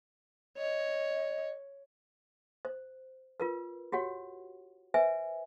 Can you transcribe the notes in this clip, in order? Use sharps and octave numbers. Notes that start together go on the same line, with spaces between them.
C#5 D#5
C5
F4 A#4 B4
F#4 G4 C#5 F#5
B4 C5 E5 G#5